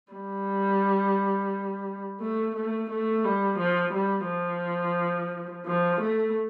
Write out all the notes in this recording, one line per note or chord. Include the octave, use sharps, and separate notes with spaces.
G3
A3
A3
A3
G3
F3
G3
F3
F3
A3